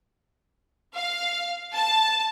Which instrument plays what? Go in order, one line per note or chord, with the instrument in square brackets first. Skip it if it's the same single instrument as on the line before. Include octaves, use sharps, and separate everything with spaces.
[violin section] F5
A5